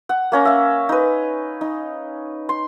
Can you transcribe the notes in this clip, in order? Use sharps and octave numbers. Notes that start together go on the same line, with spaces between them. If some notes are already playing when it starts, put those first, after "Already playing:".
F#5
A#3 C#4 A#5
E5 F5
D#4 B4
D#4
C6